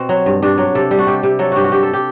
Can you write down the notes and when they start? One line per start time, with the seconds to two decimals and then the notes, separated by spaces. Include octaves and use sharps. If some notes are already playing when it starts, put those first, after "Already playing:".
Already playing: B2 C4
0.09 F#3
0.26 G2
0.43 G2 D4
0.58 F#3
0.75 C3 A4
0.91 G3
0.99 F#4
1.07 C3 G4
1.23 C3
1.39 F#3 A4
1.52 G2 F#4 G4
1.64 F#4
1.72 G2 G4
1.83 A4
1.93 G4